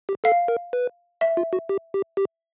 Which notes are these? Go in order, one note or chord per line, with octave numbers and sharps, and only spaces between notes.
G4
A4 F5
A#4
B4
E5
F4
F#4
G4
G4
G4